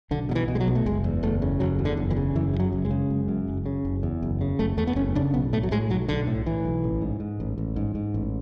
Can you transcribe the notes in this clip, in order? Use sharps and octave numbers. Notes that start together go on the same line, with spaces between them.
B1 D3
B2 F#3
E3
B2
G#3
F#3
B1
A3
F#1 G#3
E2
F#1 A3
C#3
F#1 F#3
E2
D3
F#1
E3
C#3
F#1 E3
F#2
F#3
F#1
G#3
C#3
F#1
F#2
F#1
C#3
F#1
E2
F#1
C#3
F#1 A3
E2 A3
B3
F#1 C#4
C#3 D4
B1 B3
A2 A3
F#3
A2 G#3
B1 F#3
B1 D3
A2
A2 E3
B1
A1
G#2
G#2
A1
A1
G#2
G#2
A1